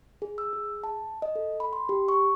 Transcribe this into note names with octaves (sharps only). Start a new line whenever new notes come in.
G#4
E6
G#4
A5
D#5
A4
B5
C6
G4
C#6